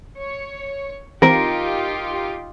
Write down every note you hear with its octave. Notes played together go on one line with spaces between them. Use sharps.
C#5
E3 C4 D#4 F4 G4 A#4